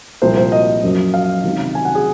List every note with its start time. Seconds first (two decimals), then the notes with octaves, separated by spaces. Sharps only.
0.22 C2 A#2 F3 C5
0.37 C5
0.52 D#5
0.83 F#2 F3
1.14 F5
1.44 C#2 C3 D#3
1.75 G#5
1.85 F#5
1.95 G#4